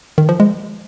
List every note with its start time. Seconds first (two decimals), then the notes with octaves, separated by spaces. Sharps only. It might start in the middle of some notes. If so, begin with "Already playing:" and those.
0.18 D#3
0.29 F3
0.40 G#3